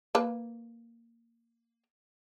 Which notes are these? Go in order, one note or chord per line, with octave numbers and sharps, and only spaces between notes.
A#3 B4